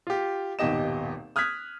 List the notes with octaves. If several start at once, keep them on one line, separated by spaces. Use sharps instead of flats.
F4 G4
D#1 G#1 B2 G4 D#5 E7
D#6 F6 F#6 G#6 B6